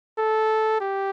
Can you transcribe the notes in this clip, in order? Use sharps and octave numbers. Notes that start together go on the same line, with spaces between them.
A4
G4